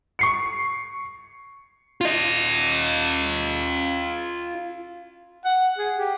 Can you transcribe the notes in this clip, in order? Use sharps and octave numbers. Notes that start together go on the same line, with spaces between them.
C#6 C7 C#7
F4 D#5
F#5
G#4
G4